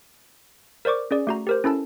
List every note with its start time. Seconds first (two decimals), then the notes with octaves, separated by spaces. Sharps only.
0.85 A#4 C5 D5 C#6 D6
1.11 C#4 G#4 D5
1.27 A3 F#4 A#5
1.47 G4 A#4 C5
1.64 C#4 E4 A4 A5